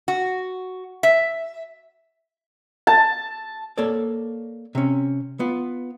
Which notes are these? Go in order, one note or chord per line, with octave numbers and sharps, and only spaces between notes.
F#4
E5
A5
A#3 A4 C#5 D5
C3 C#4
B3 F4